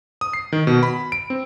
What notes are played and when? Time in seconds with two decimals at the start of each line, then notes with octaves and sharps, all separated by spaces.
0.21 D#6
0.33 C7
0.52 D#3
0.67 B2
0.83 B5
1.12 D7
1.30 C4